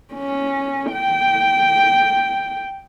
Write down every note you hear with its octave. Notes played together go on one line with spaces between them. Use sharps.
C#4
G5